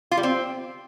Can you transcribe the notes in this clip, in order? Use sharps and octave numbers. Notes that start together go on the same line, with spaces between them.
F4
G3
C4